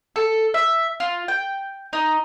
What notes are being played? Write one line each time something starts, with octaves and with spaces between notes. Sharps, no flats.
A4
E5
F4
G5
D#4